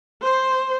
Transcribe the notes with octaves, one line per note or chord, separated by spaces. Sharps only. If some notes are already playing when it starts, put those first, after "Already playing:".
C5